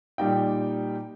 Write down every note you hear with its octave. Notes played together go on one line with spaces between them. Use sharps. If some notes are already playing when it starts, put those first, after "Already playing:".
A#2 G3 D#4 G5